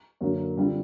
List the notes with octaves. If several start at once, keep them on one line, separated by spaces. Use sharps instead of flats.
F#2 D3 F#3 A#3 C#4
D3 G3 C4 F4